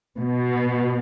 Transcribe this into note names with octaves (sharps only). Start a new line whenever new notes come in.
B2